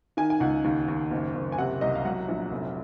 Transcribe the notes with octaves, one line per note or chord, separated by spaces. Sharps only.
D#3 G#5
G#5
C#2 F#5
D#2
D#2
F#1
F#1
G#5
C3 F#5
C2 D#5
F5
F#3 F#5
A#1
F1